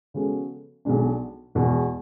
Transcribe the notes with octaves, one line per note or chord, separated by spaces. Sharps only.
C#3 G#3 B3 F#4 A4
B1 B2 G#3 D4
E1 E2 B2